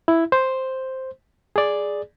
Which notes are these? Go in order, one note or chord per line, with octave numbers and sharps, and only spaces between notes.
E4
C5
G#4 D5